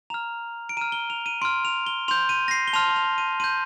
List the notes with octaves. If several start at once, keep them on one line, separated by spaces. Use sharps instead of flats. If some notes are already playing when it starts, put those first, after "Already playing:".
A#5 F6 F7
D7
A#5 F6 D#7
G7
F7
D#7
C6 F6 D7
F7
G7
C6 G6 F7
D#7
A#6
C7
G7
A5 C6 F6 F7
F7
D#7
C6 G6 D#7